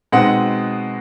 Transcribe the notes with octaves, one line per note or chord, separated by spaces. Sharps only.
B2 G#3 C4 D#4 F#5